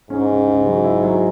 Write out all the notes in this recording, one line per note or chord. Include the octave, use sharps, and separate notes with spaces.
G#2 C#4
C#3
C#3
F#3
E4
F#3